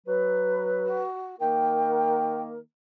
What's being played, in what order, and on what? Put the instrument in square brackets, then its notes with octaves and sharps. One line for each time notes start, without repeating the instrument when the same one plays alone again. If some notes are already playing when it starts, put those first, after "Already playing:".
[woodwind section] F#3 B4
[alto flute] F#4
[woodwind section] D#3 A#3 A#4 [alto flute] G5